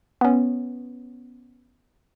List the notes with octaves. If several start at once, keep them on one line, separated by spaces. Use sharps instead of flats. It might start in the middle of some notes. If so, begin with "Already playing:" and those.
B3 C#4